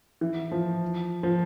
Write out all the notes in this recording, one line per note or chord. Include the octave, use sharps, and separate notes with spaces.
E3
F3
F3